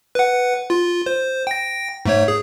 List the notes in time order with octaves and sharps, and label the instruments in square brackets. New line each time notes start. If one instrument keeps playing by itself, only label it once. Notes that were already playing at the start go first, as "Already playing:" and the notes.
[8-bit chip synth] B4 F#5
F4
C5
G5 A#6
G#2 A3 C#5
G#4